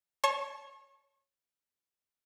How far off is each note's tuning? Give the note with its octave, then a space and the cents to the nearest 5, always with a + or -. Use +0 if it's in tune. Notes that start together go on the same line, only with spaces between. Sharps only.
C#5 +0 A5 -20 C#6 -35